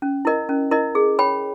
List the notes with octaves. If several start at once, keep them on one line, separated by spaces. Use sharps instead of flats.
C#4
E4 A#4 D#5
C#4
E4 A#4 D#5
G#4
C#5 G5 B5